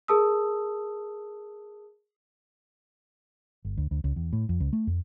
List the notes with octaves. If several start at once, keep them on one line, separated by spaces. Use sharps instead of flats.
G#4 A#4 A5 D#6 E6
G1
D2
D2
C#2
E2
A2
F2
C#2
A3
F2